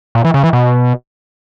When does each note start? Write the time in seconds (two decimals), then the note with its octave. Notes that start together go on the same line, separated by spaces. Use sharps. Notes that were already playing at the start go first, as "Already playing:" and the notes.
0.15 A#2
0.25 E3
0.34 C#3
0.44 E3
0.53 B2